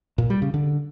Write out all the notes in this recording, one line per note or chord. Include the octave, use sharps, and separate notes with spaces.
A#2
G3
C#3
D3